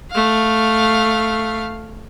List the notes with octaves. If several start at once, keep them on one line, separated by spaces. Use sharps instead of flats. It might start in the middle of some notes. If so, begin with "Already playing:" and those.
A3 F5